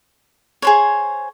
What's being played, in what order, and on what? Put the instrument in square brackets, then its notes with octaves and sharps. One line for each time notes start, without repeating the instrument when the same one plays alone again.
[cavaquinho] G#4 C5 C#5